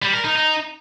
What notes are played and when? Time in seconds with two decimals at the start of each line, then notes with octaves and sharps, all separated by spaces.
0.02 G3
0.13 A#4
0.25 D#4
0.36 D#4